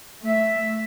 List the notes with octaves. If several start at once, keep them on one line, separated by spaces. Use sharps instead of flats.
A3 E5